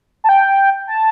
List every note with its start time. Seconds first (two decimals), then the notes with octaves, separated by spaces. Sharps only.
0.24 A5
0.29 G5
0.87 A5